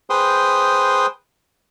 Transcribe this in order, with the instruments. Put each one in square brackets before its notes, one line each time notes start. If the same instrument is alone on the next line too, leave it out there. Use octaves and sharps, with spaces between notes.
[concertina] G#4 B4 C5 G5 C6 D#6